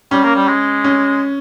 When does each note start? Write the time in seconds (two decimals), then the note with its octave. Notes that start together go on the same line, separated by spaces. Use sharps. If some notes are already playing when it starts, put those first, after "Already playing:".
0.11 G3 C#4
0.24 A#3
0.36 G3
0.48 G#3
0.84 C#4